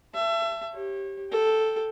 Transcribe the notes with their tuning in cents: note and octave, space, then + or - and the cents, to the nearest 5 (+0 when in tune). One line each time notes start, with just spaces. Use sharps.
E5 +30 A5 +0
G4 -5 C#5 -35
A4 +0 G5 +0